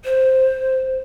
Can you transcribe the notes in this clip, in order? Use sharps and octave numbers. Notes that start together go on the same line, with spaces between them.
C5